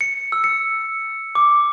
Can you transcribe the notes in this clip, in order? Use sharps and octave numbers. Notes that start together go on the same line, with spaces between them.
C#7
E6
C#7
D6